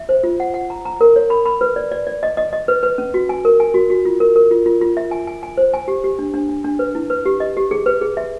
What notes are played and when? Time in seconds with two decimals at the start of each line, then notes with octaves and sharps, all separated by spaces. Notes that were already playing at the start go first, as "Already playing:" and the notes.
Already playing: E5
0.09 C5
0.23 F4
0.40 F#5
0.54 F#5
0.70 A#5
0.85 A#5
1.01 A#4
1.16 C#5
1.30 B5
1.46 B5
1.61 B4
1.76 D5
1.91 D5
2.07 D5
2.23 D#5
2.37 D#5
2.53 D#5
2.68 B4
2.83 B4
2.98 C#4
3.14 F#4
3.29 G#5
3.45 A#4
3.60 G#5
3.74 F#4
3.90 F#4
4.05 F4
4.20 A#4
4.36 A#4
4.51 F4
4.66 F4
4.81 F4
4.97 E5
5.11 G#5
5.27 G#5
5.43 G#5
5.57 C5
5.74 G#5
5.88 G4
6.04 G4
6.19 D4
6.34 D4
6.49 D4
6.64 D4
6.79 B4
6.95 E4
7.10 B4
7.26 G4
7.40 D#5
7.57 G4
7.71 G#4
7.86 B4
8.01 G#4
8.17 E5